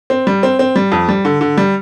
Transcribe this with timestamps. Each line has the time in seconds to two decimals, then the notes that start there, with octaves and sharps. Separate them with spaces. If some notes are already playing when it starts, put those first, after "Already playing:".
0.10 C4
0.27 G3
0.43 C4
0.59 C4
0.76 G3
0.92 F2
1.09 G3
1.25 D3
1.41 D3
1.58 G3